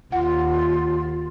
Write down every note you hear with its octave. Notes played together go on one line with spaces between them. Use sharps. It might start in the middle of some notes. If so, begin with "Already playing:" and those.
D#2 F4 F#5